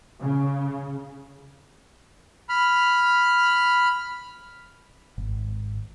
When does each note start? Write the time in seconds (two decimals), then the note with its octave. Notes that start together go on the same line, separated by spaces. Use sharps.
0.22 C#3
2.49 B5 F6
5.18 G#1